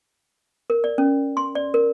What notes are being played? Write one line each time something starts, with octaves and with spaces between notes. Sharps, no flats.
A#4
D5
C#4
C6
D5
A#4